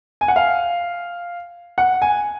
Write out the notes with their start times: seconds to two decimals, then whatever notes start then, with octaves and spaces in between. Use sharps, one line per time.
0.21 G#5
0.28 F#5
0.36 F5
1.78 F#5
2.02 G#5